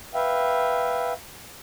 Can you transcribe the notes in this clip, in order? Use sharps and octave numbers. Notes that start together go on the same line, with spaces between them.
B4 E5 F5 G5